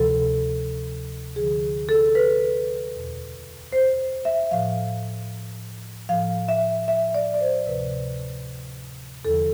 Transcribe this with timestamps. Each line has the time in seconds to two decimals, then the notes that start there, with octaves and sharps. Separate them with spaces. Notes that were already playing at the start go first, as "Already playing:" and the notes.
Already playing: D2 C3 F3 A4
1.36 D2 D3 F3 G#4
1.89 A4
2.15 B4
2.94 E2 B2
3.72 C5
4.25 E5
4.51 A2 F3 F5
6.09 A2 F3 F5
6.49 E5
6.88 E5
7.14 D5
7.34 D5
7.41 C5
7.66 D2 C3 F3 B4
9.25 E2 D3 F3 A4